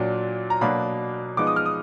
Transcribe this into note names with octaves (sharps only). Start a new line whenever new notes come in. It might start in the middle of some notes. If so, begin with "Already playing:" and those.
Already playing: A#2 F#3 D4
A#5
B2 F#3 A#3 D4 B5
F3 G#3 B3 D#4 D6
D#6
F6
D#6